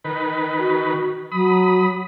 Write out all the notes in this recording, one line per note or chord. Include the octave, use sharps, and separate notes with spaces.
D#3 B4
F#4
F#3 B5 D#6